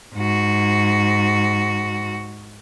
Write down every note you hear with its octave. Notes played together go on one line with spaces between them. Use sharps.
G#2 F#4